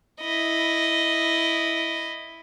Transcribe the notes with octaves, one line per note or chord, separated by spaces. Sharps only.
E4 D#5